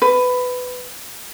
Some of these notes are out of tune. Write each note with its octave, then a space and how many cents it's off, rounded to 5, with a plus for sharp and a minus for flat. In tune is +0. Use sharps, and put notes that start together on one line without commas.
B4 +15